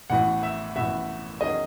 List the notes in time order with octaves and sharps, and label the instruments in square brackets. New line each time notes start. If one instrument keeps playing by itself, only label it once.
[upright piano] A1 A2 E3 B3 F#4 [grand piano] F#5
[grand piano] E5
[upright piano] A1 A2 E3 B3 F#4 [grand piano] E5
[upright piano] E2 D#3 F#3 C#4 G#4 [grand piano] D#5